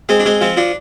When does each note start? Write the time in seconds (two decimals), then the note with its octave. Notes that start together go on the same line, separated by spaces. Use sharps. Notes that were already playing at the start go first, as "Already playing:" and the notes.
0.09 G#3 C4
0.20 D4
0.26 G#3 C4
0.41 F3 C4
0.57 F3 D4